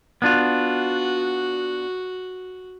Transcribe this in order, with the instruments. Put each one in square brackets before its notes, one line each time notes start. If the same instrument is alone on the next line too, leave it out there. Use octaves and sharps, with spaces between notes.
[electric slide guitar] B3 D4 F4 [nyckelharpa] F#4